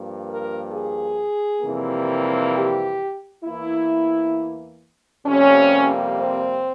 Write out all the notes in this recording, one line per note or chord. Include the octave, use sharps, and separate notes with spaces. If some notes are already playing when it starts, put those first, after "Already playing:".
Already playing: G2 F3 A#3
A#4
G#4
F2 C3 E3 G3 A#3
G4
E2 E3 A#3 E4
F2 C3 G3 A#3 C#4
C4